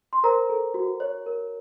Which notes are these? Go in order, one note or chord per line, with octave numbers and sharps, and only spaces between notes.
C6
A#4 C5 A#5
A4
F#4
C#5
A#4